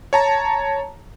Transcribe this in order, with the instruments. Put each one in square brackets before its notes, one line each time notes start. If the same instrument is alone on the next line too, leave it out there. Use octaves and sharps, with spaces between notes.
[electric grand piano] C#5 A5 A#5